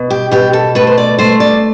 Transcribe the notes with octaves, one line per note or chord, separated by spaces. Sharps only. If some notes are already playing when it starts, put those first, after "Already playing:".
Already playing: B2
G4
B2 G4
A4
A3 B4
C5
D5
A3 C5
D5